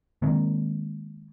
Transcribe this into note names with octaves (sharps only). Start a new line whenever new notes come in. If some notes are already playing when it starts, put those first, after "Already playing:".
D#3 G#3 A#3 C4